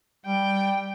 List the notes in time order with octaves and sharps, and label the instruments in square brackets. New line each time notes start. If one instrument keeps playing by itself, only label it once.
[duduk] G3 [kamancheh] G5